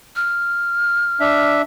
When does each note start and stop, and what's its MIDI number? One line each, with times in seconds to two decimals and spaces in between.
0.16 1.53 89
1.20 1.62 62
1.20 1.62 76